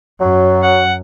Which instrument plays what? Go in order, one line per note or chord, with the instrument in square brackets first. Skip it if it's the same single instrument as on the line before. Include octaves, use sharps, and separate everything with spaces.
[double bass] F#2 [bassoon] F#3
[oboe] F#5